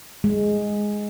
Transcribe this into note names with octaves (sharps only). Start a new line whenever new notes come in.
G#3